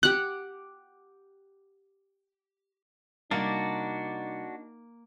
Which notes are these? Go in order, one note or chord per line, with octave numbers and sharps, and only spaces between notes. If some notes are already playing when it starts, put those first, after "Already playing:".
G4 F#5 F#6
C3 G3 A#3 D4 D#4 F#4 D5 B5